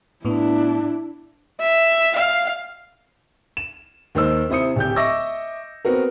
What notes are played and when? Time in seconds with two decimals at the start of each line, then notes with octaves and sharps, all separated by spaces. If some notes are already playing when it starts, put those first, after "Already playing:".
0.25 A2 B3 D4 E4
1.61 E5
2.16 F5
3.57 E7
4.15 D#2 D#3 C5 E6
4.49 C3 E4 C5 D#6 C#7
4.76 D1 G4 G6
4.96 D#5 E5 C#6 D6 E6 A#6
5.85 B3 C4 F#4 A#4